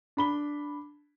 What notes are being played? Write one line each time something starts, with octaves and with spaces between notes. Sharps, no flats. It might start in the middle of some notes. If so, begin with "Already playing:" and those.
D4 B5 G7